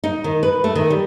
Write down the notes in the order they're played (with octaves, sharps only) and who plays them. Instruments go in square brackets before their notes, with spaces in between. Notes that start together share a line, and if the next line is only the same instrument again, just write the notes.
[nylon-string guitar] D#4
D#3
B4
A3
D#3
G3